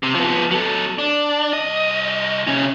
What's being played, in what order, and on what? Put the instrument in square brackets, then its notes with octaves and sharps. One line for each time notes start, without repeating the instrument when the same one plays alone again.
[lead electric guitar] C3
F3 B3
F#3 A4
D4
C2 D#5
C3 C#4